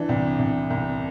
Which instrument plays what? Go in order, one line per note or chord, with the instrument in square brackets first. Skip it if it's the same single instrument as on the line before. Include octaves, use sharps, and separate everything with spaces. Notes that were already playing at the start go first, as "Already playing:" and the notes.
Already playing: [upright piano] E3 D4
C2
C2
C2